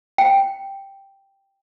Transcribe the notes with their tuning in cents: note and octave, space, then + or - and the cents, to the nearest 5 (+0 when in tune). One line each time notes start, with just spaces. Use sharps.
G5 +0